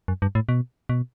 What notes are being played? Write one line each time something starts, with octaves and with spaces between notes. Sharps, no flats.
F#2
G2
A2
B2
B2